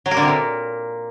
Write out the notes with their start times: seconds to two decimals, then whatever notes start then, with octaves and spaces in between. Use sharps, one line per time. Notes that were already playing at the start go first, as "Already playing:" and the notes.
0.06 F#3
0.11 A#3
0.17 D3
0.22 C3
0.28 A#2